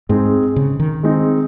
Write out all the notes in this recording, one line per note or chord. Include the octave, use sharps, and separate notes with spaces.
G#2 G#3 C4 D#4 G#4
C#3
D#3
G#3 C4 D#4 G#4